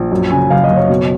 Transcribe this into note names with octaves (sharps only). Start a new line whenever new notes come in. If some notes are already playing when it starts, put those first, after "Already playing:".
Already playing: A#1
F#2
C#3 G#5
F#1 F5
D#5
F#1
C#5
B2